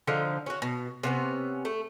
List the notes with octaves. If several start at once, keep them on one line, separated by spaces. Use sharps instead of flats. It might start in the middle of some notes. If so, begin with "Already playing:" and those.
D3 F3 D#4
C#4 F#4
B2
C3 B3 C#4
A3